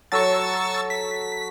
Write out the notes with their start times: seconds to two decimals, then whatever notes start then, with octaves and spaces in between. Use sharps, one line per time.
0.12 F#3 A4 C#6 E6 A6
0.90 B6